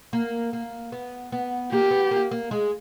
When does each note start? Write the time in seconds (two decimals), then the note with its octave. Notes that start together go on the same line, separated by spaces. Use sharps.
0.13 A#3
0.53 A#3
0.92 B3
1.32 B3
1.71 A#3 G4
1.91 B3
2.11 A#3
2.31 A#3
2.51 G#3